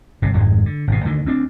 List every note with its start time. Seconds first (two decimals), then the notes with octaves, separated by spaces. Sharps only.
0.22 G1 C3
0.34 G#1 F2 G#2 G#3
0.66 D3
0.87 G#1 B2
1.05 D2 D3 D#3
1.25 D2 C4 D4